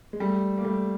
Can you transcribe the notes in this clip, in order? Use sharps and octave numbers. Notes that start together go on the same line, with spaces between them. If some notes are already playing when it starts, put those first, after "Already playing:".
G#3
G3 A3
A#3
G3 A3